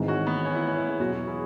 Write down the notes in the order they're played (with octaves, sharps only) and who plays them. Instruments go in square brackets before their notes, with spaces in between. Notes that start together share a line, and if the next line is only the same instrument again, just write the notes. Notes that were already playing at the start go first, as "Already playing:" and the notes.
Already playing: [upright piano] G#1 G#2 E3 G#3
[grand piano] C#4 F#4
B3
C#4
E4
C#4
E4
G#3 C#4
[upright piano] E2 B2 F#3 [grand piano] C#4 F#4
[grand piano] E4 G#4